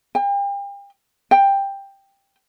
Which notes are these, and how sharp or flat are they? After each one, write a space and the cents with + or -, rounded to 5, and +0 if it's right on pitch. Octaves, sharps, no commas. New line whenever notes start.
G5 +40
G5 +10